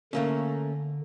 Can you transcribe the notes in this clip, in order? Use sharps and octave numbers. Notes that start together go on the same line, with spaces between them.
D3 A3 A#3 C#4